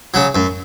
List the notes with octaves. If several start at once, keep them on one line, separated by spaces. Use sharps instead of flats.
C#3 F#3
F#2